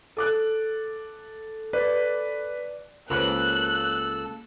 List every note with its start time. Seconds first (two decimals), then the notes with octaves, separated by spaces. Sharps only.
0.17 A4 D6 F#6
1.73 B4 D5
3.10 C#2 A#3 C#4 A4 B4 E6 F#6